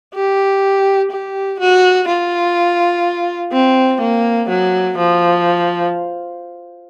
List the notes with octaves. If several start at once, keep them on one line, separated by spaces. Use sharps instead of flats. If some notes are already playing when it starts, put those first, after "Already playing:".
G4
G4
F#4
F4
C4
A#3
F#3
F3